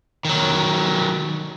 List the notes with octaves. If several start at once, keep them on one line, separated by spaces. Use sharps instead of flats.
D#3 F#3